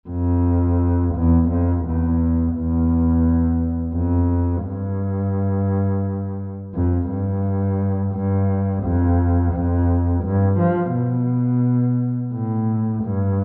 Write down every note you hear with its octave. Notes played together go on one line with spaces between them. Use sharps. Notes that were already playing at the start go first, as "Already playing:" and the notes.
F2
E2
F2
E2
E2
F2
G2
F2
G2
G2
F2
F2
G2
F3
B2
A2
G2